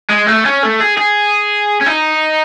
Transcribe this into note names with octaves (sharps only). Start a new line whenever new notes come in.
G#3
A3
C#4
A3
G#4
G#4
C#4
D#4